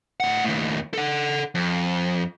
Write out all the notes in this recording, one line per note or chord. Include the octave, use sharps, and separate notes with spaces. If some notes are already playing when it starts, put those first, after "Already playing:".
A2 F#5
D#2 A2
A4 F#5
F2